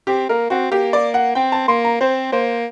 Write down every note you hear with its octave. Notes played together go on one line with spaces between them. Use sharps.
C4 G4
A#3 A#4
C4 F#4
A#3 G4
D5
F#5
C4 G5
A5
A#3 C6
A#5
C4 C5
A#3 C5